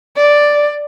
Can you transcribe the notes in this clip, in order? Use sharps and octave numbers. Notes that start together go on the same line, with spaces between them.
D5